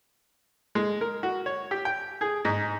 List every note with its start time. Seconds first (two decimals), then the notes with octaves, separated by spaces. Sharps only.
0.75 G#3
1.01 A#4
1.23 F#4
1.46 C#5
1.71 G4
1.85 G5
2.21 G#4
2.45 G#2